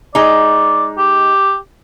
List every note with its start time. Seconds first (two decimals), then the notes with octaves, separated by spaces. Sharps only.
0.15 G#3 D#4 D5
0.98 G4